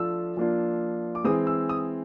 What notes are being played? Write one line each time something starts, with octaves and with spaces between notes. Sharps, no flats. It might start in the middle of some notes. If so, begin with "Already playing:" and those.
Already playing: F3 A3 D4 F4 E6
F3 A#3 D4 F4
D6
E3 G#3 C4 D#6
E6
D#6